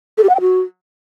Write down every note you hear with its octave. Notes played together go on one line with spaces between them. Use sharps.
A4
G4
F#5
G5
F#4